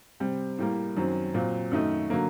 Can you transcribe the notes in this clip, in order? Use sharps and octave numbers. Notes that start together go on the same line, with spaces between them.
C3 G3 C4
A2 G3 A#3
F#2 D#3 F#3 C4
A#2 F#3 C4
F#2 D#3 A3 D#4
D3 F#3 A#3